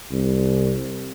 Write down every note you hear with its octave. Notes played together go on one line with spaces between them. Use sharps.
C2